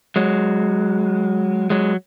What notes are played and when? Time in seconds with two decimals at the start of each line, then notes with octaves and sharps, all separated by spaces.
0.16 F#3 G#3
1.70 F#3 G#3